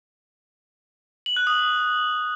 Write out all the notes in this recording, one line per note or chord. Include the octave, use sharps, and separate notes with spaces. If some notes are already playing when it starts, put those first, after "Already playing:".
F#7
F#6
D#6